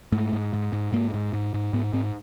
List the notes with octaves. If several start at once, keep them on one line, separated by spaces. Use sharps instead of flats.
G#2 A3
G#2
G#2
G#2
G#2 A#3
G#2
G#2
G#2
G#2 B3
G#2 C4